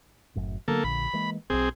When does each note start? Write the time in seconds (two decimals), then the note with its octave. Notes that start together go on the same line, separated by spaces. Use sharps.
0.35 F#1 F#2 A2
0.68 D3 F#3 A#3 B3 A4
0.84 A#1 A#2 D3 B5
1.13 E3 G#3 A#3
1.50 E1 B1 C4 G#4